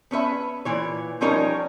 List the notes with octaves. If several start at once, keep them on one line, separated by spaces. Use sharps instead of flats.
B3 C#4 B4 E5
A#2 E3 C#5
F3 G3 C#4 D#4 A#4 C#5